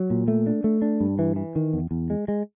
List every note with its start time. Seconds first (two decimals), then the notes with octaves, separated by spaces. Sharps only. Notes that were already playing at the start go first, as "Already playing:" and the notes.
Already playing: F#3
0.10 A#2
0.28 A3
0.47 D4
0.64 A3
0.82 D4
1.00 G2
1.19 E3
1.36 E3
1.56 D#3
1.73 E2
1.91 E2
2.10 G#3
2.28 G#3